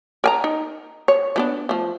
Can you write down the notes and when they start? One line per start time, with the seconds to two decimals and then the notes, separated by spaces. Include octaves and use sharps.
0.24 A#4 G#5 A#5
0.44 D#4
1.08 C#5
1.36 F3 B3 D4
1.69 F3 A3